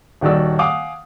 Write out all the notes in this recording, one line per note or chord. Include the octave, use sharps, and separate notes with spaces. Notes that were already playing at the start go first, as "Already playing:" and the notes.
D#1 D#3 F#4 D5 E6
F5 F#5 G#5 D6 D#6